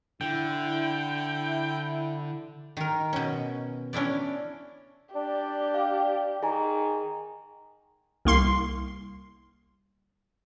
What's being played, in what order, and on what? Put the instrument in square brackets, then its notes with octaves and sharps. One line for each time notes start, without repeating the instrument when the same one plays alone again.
[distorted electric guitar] D3 [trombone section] E4 [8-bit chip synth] G5
[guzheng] D#3 A#4
B2 C#4
C#4 D4 E4 D5
[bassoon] D4 [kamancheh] G4 [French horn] D5
[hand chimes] F5
[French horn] D#3 [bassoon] D#4 [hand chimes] G#4 G#5 A#5
[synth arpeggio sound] C2 A#3 C6 C7